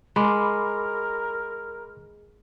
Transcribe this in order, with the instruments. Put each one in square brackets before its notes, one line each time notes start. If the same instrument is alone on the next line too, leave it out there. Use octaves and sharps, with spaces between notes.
[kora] G#3 [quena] A#4 [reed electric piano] B5 C6 D6